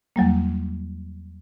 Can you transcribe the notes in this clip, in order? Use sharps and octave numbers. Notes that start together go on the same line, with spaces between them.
E2 F#3 G3 A#3